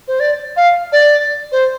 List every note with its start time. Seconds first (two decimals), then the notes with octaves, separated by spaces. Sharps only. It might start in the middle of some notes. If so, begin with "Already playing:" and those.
0.08 C5
0.20 D5
0.56 F5
0.92 D5
1.52 C5